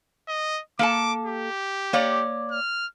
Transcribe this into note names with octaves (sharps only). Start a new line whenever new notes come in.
D#5
A#3 A4 A5 D6
G4
A#3 C#5 D5
F6